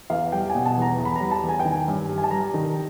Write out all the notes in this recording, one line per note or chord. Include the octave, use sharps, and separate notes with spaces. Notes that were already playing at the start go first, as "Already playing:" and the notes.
E2 F5
G3 G5
G#5
B2
A5
E2 A#5
E2
B5
G3 A#5
A5
E2
G#5
G5
D#3
G#5
G2
G3
G#5
A5
G3 A#5
D#3